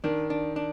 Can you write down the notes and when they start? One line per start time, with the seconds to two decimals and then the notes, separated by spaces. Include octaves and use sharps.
0.04 D#3 D4
0.30 D4
0.56 D4